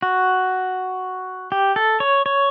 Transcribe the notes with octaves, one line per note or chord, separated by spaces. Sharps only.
F#4
G4
A4
C#5
C#5